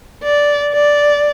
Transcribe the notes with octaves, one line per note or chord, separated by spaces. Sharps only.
D5
D5